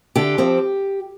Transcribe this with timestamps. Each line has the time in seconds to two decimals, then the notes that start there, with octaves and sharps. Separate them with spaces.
0.16 D3 G4
0.38 F3 C4